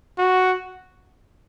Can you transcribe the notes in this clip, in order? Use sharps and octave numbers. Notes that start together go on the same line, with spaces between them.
F#4